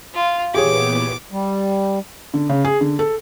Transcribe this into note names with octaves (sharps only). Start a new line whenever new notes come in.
F4
A#2 E3 B3 G4 G#4 C#5 D6
G3
D3
C#3
G#4
D3
A4